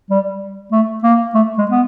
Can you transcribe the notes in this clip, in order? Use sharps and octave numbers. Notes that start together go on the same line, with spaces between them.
G3
A3
A#3
A3
G#3
B3